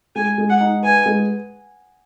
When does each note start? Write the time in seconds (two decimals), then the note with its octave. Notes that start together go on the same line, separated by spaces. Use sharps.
0.15 G#3 G#5
0.38 G#3
0.49 F#5
0.61 D#4
0.83 B4 G#5
1.06 G#3